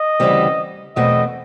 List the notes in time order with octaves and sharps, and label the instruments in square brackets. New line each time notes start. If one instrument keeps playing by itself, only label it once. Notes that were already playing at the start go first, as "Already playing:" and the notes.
Already playing: [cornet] D#5
[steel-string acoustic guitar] D2 C#3 E3 G3 C4
[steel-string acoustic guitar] E2 B2 F#3 A3 C4 [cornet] D#5